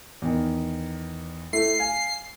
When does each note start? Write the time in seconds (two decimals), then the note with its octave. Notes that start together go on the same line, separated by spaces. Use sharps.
0.22 E2 D#3
1.53 A3 E4 C7
1.79 F5 G#5